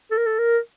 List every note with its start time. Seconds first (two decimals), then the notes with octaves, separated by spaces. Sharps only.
0.11 A4
0.18 A#4
0.26 A4
0.39 A#4